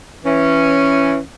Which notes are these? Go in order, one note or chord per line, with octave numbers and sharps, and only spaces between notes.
E3 C#4